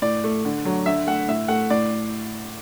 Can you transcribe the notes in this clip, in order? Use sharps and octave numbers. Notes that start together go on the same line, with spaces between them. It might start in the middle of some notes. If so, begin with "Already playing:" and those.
A2 D5
A3
D3
F#3 A3
D3 E5
A3 F#5
A2 E5
A3 F#5
A2 D5